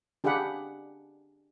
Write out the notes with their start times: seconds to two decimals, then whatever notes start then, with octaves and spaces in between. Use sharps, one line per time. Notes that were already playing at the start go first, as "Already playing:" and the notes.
0.24 D4 G4 G#4 F5 F#5 B5